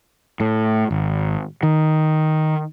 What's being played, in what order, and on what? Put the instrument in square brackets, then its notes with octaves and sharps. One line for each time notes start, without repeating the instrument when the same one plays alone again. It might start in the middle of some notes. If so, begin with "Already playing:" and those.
[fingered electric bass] A2
G#1
D#3